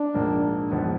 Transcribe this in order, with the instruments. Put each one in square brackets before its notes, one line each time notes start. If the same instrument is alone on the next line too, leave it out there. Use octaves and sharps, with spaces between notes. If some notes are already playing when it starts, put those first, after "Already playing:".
Already playing: [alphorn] D4
[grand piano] A#1 G#2 F3 A#3
A#1 G#2 F3 B3